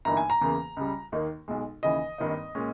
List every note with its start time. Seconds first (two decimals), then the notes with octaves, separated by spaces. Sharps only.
0.05 G1 G2 E3 A#3 D#4 A#5
0.17 G#5
0.30 A#5
0.41 E2 C#3 E3 A#3
0.77 C#2 C#3 G3
1.12 D#2 D#3 A#3 D#4
1.48 B1 B2 G#3
1.83 D#2 C#3 E3 D#5
2.18 G#1 G2 D#3 A#3 D#4
2.55 A#2 G#3 C#4